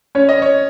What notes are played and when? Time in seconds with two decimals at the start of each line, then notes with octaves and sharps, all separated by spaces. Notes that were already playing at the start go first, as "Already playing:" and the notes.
0.15 C#4 C#5
0.29 D#5
0.42 C#5